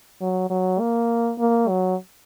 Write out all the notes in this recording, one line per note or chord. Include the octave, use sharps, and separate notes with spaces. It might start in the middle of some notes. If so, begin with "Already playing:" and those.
F#3
F#3
A#3
A#3
F#3